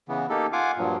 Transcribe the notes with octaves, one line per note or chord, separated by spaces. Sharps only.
C#3 E3 B3
A#3 D#4 G4 A4
F4 F5 F#5 G#5 D6
G2 A#2 F3 F#3